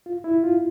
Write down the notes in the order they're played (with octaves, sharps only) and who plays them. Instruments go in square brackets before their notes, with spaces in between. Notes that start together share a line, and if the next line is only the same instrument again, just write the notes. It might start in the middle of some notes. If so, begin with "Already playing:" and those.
[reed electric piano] F4
E4
F4